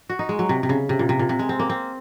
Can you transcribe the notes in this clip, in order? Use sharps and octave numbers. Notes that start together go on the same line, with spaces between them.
F#4
D#4
G#3
F#3
C3
C3
C#3
C3
A#2
C3
A#2
C3
G#3
C4
A#3
C4